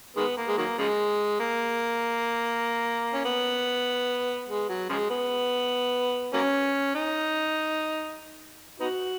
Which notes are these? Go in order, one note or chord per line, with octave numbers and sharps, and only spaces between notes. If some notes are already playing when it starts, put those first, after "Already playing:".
D#3 G#3 B3
A#3
G#3
D#3 F#3 A#3
C#3 F3 G#3
A#3
C#4
B3
G#3
F#3
C#3 F3 G#3
B3
F#3 A#3 C#4
D#4
B3 D#4 F#4